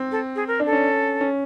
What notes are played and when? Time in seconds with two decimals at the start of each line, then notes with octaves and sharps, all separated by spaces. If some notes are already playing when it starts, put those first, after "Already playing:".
Already playing: C4
0.12 A4
0.36 G#4
0.48 A#4
0.60 D4
0.66 A4
0.73 C#4
1.21 C#4